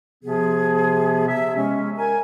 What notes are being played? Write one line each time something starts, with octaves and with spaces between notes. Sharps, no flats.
C3 F3 B3 G#4
C3 E5
G#3 C#4
A#4 G#5